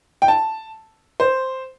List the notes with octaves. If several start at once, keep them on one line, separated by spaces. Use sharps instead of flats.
G5
A5
C5